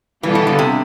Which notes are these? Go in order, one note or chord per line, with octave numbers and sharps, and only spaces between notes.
B2 E3 G3 B3 F4 A4
E3
D3
C3